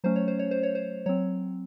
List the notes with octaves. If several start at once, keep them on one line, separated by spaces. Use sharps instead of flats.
F#3 A3 C#4 C5
C#5
C5
C#5
C5
C#5
C5
F#3 C4 C#5